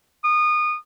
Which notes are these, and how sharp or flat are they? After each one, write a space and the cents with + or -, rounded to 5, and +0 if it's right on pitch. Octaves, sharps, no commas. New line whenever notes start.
D#6 -25